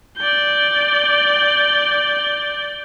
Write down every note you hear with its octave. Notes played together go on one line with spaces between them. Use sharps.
D5 G6